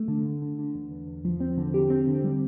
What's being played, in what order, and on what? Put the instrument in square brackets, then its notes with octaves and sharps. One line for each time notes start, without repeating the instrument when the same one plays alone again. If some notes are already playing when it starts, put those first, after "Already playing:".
Already playing: [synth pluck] A3
D3
D3
D3
D3
E2
E2
E2
F3
C4
D3
G4
C4
D3
G3